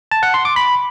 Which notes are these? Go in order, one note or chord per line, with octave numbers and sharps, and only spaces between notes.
A5
F#5
C6
D6
B5